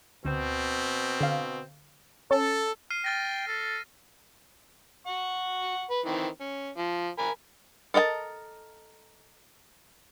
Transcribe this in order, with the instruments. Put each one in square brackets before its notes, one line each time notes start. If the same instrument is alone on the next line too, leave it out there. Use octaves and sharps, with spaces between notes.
[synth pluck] D2 [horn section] B2 C4
[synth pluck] D3 F5
[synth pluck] C#4 [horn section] A4
[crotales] F6 C7 D#7
[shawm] G5 [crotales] F6 A6 A#6
[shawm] A4
[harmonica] F#5 C#6
B4
D#3 E3 C4
C#4
F3
A#4 G#5 B5
[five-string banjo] A4 A#4 D#5 G5 A5